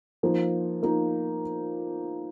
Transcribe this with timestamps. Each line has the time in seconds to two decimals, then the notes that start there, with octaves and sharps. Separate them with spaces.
0.23 F3 A#3 D#4
0.83 F3 A#3 D#4